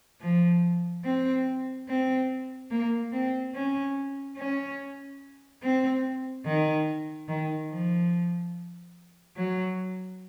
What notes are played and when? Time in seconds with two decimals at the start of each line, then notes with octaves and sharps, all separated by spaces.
0.21 F3
1.04 C4
1.88 C4
2.71 A#3
3.13 C4
3.55 C#4
4.37 C#4
5.62 C4
6.46 D#3
7.28 D#3
7.71 F3
9.36 F#3